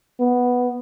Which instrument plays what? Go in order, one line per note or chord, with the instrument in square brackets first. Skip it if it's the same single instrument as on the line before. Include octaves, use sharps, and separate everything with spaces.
[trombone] B3